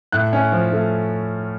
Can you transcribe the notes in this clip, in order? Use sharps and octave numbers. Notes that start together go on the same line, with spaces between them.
A2 F#6
C#4
F3
A3